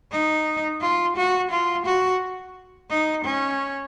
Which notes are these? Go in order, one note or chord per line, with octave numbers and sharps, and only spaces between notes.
D#4
F4
F#4
F4
F#4
D#4
C#4